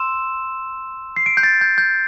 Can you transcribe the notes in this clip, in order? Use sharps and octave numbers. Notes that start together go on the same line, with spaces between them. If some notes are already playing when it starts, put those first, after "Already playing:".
Already playing: C6 E6 E7
C7
D7
G6
A6
G6
G6